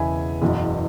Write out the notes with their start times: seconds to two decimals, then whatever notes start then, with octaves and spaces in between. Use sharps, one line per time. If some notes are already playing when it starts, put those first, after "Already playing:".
Already playing: E1 E2 C#3 E3 B3 E5 G#5 B5
0.42 F#1 E2 B2